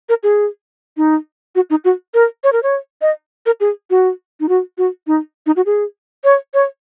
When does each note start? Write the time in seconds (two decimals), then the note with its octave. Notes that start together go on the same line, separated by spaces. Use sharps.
0.09 A#4
0.23 G#4
0.97 D#4
1.55 F#4
1.70 D#4
1.85 F#4
2.14 A#4
2.44 C#5
2.53 A#4
2.63 C#5
3.02 D#5
3.46 A#4
3.60 G#4
3.90 F#4
4.40 D#4
4.49 F#4
4.78 F#4
5.07 D#4
5.46 D#4
5.56 F#4
5.66 G#4
6.24 C#5
6.54 C#5